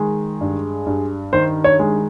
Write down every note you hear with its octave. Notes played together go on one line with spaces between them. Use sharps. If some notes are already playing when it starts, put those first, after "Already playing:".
Already playing: D#3 G#3
G2
G2
D#3 C5
C#5
G#3